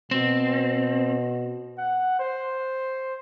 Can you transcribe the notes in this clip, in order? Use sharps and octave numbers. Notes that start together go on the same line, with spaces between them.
B2 C4
F#5
C5